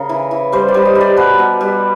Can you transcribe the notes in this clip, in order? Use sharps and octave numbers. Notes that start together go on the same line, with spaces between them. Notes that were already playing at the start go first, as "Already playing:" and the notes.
Already playing: C#3 A#4
E3
E3
G3 C5
D5
G3
D#5
G3
D5
B2 B4
B2
G3